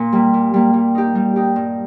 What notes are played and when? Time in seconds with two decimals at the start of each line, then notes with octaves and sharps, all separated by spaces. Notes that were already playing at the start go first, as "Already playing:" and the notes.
Already playing: A#2
0.12 G3 A#3
0.33 A#2
0.54 G3 A#3
0.74 G3
0.95 D#4 G4
1.15 G3
1.36 D#4 G4
1.56 G2